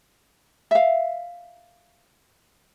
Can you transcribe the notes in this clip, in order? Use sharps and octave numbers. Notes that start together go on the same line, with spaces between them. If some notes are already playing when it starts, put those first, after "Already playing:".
E5 F5